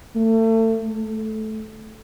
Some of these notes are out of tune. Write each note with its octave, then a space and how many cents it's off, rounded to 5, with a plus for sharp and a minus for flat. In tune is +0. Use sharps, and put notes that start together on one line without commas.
A3 +30
A3 -15